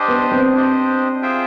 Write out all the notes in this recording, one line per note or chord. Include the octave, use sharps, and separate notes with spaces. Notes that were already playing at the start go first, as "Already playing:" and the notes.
Already playing: D4 G4 C5 D#5
B3
C4
D4 G4 C5 D#5
F4 G#4 C5 E5 G5